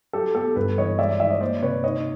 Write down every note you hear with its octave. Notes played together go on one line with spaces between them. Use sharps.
F#3 G4 A4
B3 G4 A4
G2 A4 B4
E3 C#5 D#5
G#3 D5 E5
D#3 D5 E5
C#5 D#5
A#3 C5 D5
C3 B4 C#5
D#4 C#5 D#5